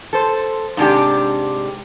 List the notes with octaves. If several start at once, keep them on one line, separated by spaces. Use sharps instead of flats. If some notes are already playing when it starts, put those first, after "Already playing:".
A4 C5
G#2 C3 D4 G4